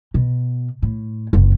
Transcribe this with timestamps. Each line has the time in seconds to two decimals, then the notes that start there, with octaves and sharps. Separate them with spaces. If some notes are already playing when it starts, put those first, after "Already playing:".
0.14 B2
0.82 A2
1.33 F#1 F2